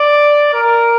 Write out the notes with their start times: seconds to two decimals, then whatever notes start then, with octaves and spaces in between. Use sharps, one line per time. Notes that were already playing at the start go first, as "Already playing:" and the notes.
Already playing: D5
0.53 A#4